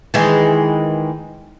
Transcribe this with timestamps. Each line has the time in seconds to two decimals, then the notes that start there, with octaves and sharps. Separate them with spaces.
0.14 D#3 E3 G#3